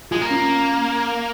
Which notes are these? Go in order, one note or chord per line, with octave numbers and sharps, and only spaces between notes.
G#3 F4
A#3
C#4
C#4